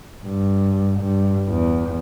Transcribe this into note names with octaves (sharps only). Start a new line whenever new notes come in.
G2
G2
E2